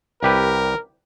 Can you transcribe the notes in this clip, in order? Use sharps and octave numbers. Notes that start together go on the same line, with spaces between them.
C2 G4 A#4 B4